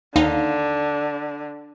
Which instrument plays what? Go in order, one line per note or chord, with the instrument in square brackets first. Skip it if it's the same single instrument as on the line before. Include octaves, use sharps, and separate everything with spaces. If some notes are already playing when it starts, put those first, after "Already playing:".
[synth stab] D#2 D#4 F5 [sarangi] D3